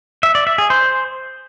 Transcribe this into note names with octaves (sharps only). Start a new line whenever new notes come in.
E5
D5
E5
G#4
C5